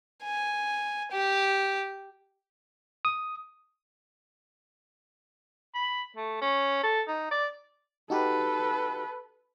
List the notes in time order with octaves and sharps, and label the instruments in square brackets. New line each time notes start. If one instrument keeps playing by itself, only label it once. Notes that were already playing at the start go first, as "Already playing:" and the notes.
[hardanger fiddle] G#5
G4
[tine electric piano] D#6
[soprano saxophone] B5
A3
C#4
A4
D#4
D5
[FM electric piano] D#4 F#4 G4 [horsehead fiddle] A4 B4